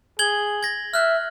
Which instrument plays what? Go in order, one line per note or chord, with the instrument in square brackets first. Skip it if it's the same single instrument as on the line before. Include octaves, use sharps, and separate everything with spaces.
[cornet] G#4 [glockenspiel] G#6 F#7 G7
[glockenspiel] G#6 A#6
[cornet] E5 [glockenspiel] F6 F#6